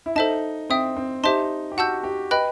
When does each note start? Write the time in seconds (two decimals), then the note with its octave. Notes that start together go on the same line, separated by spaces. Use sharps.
0.06 E4
0.16 D#4 A4 C5 E5 A5
0.70 C4 E5 G5 D#6
0.97 C4
1.23 D#4 G4 C5 E5 A5 C6
1.72 G4
1.77 F#4 F#5 A5 E6 G6
2.04 G4
2.31 B4 D#5 G5 B5 F#6